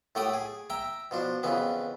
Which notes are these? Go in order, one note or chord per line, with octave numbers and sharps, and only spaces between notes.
A2 A3 G4 F#5 G5 D#6
G#4
E5 G5 A#5
B2 F3 D4
F2 C#3 E3 B3